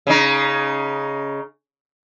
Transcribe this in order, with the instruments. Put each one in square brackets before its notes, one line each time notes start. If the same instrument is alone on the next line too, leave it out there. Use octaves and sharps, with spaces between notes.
[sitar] C#3 D#4